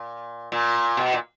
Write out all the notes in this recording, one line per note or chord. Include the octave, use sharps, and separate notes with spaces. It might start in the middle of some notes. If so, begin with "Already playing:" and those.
Already playing: A#2
A#2
B2
A#2